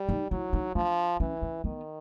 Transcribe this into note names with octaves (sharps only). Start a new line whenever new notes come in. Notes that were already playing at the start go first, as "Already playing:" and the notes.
Already playing: G3
D#4
F#3 E4
D#4
F3 D4
E3 C#4
C#4
D#3 B3